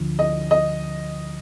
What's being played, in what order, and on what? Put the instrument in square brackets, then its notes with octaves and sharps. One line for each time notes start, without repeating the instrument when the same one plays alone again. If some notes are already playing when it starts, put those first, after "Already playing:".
Already playing: [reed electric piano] D2 D3 F3
[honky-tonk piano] D#5
D#5